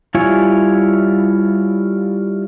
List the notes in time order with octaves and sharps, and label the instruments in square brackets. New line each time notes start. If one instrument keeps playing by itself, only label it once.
[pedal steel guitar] G3 E4 F4 C#5 G#5